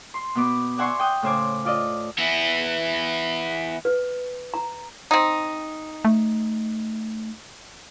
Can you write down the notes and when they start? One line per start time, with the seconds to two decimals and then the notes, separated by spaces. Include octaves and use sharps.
0.14 C6
0.35 B2 B3 D6
0.78 D5 E5 F#5 G#5 C6 C#6
1.00 G5 D#6 F#6
1.22 A2 C#3 C5 G#5 D6
1.65 F4 D5 D#5
2.18 E3 B3
3.85 B4
4.54 A#5
5.11 C4 D#4
6.05 A3